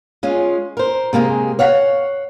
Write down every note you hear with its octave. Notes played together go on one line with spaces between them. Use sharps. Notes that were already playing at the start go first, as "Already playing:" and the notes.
G#3 C#4 F4
A#4 C5
C3 G#3 A#3 G4 G#4
C#5 F5 F#5